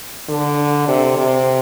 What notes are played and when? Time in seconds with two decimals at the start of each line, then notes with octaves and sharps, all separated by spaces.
0.29 D3
0.88 C3
1.17 C3